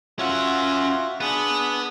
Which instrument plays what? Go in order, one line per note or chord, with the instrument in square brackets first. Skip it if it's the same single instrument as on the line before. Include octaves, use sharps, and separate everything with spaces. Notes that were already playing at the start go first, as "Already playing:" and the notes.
[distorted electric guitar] C#4 F#5 [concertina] F4 F#4 E5
[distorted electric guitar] B3 [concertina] D4 G#4